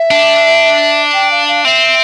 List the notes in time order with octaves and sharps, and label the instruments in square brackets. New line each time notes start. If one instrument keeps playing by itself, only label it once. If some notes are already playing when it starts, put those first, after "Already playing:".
Already playing: [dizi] E5
[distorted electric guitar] D4
[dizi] G5
F5
F5
[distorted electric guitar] C4 [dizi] E5